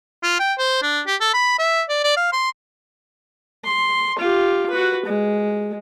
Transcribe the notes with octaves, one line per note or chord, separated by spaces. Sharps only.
F4
G5
C5
D4
G4
A4
B5
E5
D5
D5
F5
C6
C6
F4 G4
F#4 B4
G#3